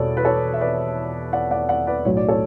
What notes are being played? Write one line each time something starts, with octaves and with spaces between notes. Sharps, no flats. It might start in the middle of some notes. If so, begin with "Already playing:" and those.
Already playing: E2 B2 G3 B3 A4 C#5 D5
B4
A4 C#5
E5
B4 D5
D5 F#5
D5 F#5
D5 F#5
B4 D5
B1 A2 F#3 A3 C#5
D5
A4 C#5